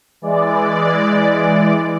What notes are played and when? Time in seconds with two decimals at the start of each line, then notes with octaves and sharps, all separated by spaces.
0.22 E3 G#3 D5